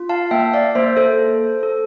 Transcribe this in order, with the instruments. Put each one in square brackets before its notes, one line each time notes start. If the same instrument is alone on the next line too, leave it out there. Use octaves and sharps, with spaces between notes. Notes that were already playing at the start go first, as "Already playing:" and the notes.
Already playing: [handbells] F4
F5 A5
A#3 E5 G5
D5 F5
A#3 C5 E5
A4 C5
A4
A4